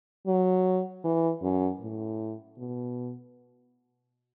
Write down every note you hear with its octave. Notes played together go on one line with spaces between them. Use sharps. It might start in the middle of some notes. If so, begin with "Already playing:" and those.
F#3
E3
F#2
A2
B2